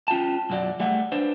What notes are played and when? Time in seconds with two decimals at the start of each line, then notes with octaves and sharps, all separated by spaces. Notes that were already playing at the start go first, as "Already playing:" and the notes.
0.08 C#4 F4 G5 A5
0.50 B1 F#2 F#4 D5
0.80 G3 A3 E5 F#5
1.12 D4 B4 C5